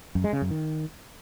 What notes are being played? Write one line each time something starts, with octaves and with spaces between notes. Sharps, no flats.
F#2
G#3
C#3
F#2
D#3